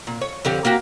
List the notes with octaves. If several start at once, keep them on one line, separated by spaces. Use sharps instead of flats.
A#2
C#5
F2 D3 G4
A#3 F#4 G4